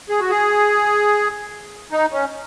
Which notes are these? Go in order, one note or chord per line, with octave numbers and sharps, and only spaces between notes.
G#4
F#4
G#4
D#4
C#4